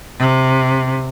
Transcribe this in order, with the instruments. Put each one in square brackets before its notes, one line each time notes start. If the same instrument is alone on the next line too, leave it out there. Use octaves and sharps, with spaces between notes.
[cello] C3